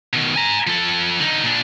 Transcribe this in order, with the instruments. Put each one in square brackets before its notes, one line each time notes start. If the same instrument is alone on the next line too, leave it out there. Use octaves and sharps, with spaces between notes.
[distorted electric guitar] B2 D#3
G#5 A#5
F3 A4
D3 D#4
A#2 D4